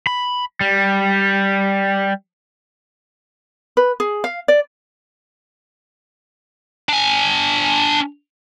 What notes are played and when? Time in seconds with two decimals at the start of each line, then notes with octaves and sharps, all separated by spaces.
0.07 B5
0.61 G3
3.77 B4
4.00 G#4
4.24 F5
4.48 D5
6.89 D4 G#5